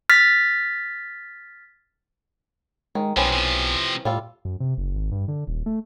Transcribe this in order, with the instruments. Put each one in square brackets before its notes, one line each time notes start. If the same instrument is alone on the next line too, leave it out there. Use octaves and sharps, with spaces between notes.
[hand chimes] F6 A6 B6
[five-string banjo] D#3 [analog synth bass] G#3
[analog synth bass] B1 [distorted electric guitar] C3 F3 [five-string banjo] E3 C4 C#4
[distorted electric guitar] C3 F3
[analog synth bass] A2 [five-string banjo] G3 F4 A4
[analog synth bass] F#2
C3
F#1
G#1
G2
D3
D#1
A3